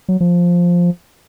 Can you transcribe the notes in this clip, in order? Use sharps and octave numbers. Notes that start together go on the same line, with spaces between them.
F#3
F3